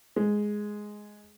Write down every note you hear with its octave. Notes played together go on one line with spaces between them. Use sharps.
G#3